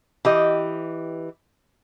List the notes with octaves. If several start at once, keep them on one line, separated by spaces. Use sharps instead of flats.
E3 G4 D#5